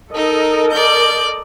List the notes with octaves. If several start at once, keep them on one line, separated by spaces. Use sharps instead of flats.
D#4 A4 A#4 D#5
D5 G6